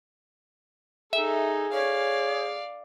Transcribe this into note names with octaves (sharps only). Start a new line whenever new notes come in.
D#4 G#4 A4 E5
C#5 D5 F5